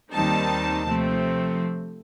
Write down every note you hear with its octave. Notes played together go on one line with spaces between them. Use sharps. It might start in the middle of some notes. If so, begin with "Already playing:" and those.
D#2 D#3 G3 C4 D#4 A5
C3 F3 A3 C4